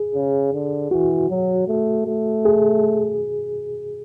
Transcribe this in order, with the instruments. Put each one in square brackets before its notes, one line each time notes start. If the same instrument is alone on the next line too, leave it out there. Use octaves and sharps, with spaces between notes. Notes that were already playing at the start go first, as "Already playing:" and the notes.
Already playing: [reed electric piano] G#4
[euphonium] C#3
D3
[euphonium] E3 [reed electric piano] F#4
[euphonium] F#3
A3
A3
[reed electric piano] G#4